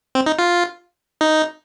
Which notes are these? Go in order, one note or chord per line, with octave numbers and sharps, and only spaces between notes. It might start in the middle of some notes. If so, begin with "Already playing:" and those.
C4
D#4
F4
D#4